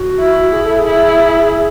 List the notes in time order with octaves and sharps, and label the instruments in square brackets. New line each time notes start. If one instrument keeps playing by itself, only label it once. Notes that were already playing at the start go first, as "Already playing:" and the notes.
Already playing: [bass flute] F#4
[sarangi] E4
[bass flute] G#4
A4
G#4
[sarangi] E4